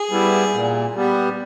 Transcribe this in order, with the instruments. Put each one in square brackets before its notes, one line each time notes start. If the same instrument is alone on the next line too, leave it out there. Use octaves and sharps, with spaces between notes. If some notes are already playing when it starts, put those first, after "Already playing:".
Already playing: [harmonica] G#4
[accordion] G3 B3 E4
A#2
G3 B3